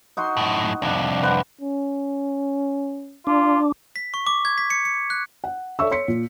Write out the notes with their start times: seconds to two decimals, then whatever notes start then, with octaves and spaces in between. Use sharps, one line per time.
0.17 D#4 F#4 C6
0.37 F#2 A2
0.82 C2 F2 D4
1.23 B4 C5 F#5
1.61 C#4
3.27 D4 F4
3.96 B6
4.14 C#6
4.27 D6
4.45 G#6
4.58 B6
4.70 C#7
4.85 C#7
5.10 F#6
5.44 F#5
5.79 A4 C#5 D5 E5 C#6 E6
5.91 C#5 C6 B6 C#7
6.08 A#2